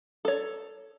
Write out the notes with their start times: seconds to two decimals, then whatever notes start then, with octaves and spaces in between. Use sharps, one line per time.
0.25 A4 C#5